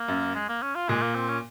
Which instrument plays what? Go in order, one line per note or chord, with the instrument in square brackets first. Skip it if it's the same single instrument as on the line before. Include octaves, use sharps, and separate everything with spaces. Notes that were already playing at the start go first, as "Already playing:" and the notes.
Already playing: [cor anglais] A#3
[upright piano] F#2
[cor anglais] G#3
A#3
C#4
F4
[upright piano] A#2 [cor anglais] G#3
[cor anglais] A#3
C4
C#4